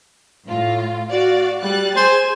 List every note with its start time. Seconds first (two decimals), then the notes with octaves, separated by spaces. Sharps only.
0.48 A2 F4
1.09 F#4 D5 F5
1.61 G3 F#6 A6
1.96 G#4 C5 G#5